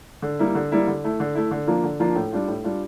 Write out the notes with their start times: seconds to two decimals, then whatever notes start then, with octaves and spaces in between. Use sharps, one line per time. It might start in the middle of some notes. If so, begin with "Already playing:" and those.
0.22 D3
0.39 G3 A#3 E4
0.55 D3
0.72 G3 A#3 E4
0.87 D3
1.04 A3 E4
1.20 D3
1.35 A3 E4
1.51 D3
1.67 F3 A#3 D4 F4
1.84 D3
2.00 F3 A#3 D4 F4
2.15 A2
2.32 G3 D4 F4
2.48 A2
2.64 G3 D4 F4